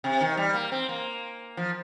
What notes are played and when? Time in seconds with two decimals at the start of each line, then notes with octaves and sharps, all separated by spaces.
0.04 C3
0.21 D#3
0.37 G3
0.54 A#3
0.72 C4
0.89 A#3
1.57 F3